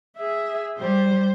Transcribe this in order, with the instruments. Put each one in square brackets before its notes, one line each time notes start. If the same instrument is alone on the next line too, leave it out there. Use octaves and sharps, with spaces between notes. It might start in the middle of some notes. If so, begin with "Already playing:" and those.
[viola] G#4 E5
[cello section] G3 [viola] C5